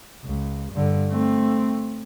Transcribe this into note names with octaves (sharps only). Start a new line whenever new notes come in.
C#2
G2 D3
A3 C4